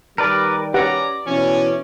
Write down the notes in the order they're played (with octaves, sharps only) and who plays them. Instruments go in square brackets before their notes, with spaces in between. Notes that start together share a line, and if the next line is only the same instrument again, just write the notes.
[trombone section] D#3 G3 [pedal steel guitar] A#4 B4 D5
[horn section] C#4 A#5 [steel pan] G4 B4 F#5 [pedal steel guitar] D5
[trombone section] B2 E3 [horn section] C#4